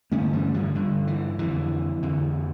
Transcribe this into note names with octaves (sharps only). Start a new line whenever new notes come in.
G2 D3 A3 C#4
E3 G3
D3 F3
G2 D3
E3
F2 D3 E3
F2 D3